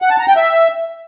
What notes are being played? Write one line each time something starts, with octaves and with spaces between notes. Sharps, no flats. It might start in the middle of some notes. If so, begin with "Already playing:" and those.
F#5
A5
A#5
G5
E5